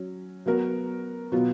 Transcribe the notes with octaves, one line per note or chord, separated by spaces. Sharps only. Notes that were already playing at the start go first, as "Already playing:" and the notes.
Already playing: F#3 C#4
F#3 B3 F#4 A#4
B2 F#3 B3 F4